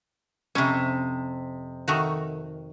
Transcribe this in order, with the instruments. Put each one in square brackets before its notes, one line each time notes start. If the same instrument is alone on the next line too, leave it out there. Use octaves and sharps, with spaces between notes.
[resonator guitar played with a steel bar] F2 C3 [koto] C#4
[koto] D#3 A3 F#4